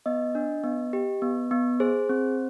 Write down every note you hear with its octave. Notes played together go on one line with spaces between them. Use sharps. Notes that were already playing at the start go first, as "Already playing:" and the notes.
B3 D#5
D4
B3
G4
B3
B3
G#4 C5
C4